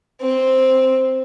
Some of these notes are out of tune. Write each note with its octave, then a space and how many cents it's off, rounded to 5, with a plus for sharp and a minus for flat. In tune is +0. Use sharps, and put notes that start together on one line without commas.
C4 +0